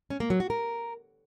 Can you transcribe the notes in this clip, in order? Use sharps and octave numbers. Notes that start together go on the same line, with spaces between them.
C#4
A#3
F#3
F#4
A#4